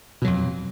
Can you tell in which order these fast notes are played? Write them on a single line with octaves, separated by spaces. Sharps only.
B2 F#3 F2